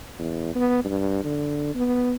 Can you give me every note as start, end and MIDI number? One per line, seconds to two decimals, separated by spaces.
0.19 0.51 40
0.55 0.83 59
0.85 1.20 43
1.24 1.73 50
1.75 2.15 59